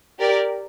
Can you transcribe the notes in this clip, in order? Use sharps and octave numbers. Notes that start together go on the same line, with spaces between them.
G4 A#4 D5